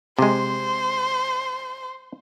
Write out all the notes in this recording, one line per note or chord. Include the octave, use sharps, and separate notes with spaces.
C3 G#3 C5